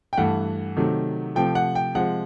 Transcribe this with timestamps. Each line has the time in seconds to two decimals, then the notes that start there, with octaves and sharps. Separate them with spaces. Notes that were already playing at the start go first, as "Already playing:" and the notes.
0.13 G5
0.17 G2 E3 A3 F#5
0.76 C3 D#3 F#3 A3
1.35 C3 F3 A3 G5
1.55 F#5
1.75 G5
1.95 C3 F3 G#3 F#5